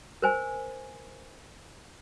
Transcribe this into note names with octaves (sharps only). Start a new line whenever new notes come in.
A#4 C5 G#5